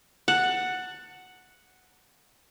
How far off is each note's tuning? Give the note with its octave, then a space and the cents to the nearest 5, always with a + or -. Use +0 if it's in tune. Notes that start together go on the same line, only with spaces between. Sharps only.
F#5 +0 A5 +25